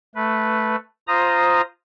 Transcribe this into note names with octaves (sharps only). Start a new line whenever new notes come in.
A3 B4
F4 C5 A#5 D#6